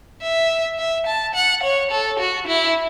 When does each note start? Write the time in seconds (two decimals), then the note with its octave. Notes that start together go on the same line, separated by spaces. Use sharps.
0.22 E5
0.78 E5
1.07 A5
1.35 F#5
1.63 C#5
1.91 A4
2.20 F#4
2.47 E4